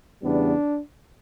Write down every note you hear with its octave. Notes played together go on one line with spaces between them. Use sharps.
E2 C#3 G3 B3 D4